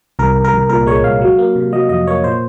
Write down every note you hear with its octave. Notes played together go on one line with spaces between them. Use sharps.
C2 A#4
C2
A#4
C2
A#2 A#4
G#3 C#5
C2 F5
F#3
A#3
C3
F#3 D#5
F2 D#5
A#3 C#5
A#2 C5